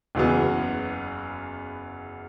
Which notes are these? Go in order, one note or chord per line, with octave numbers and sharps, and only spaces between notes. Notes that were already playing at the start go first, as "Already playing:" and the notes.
F#1 E2 C#3 F#3 B3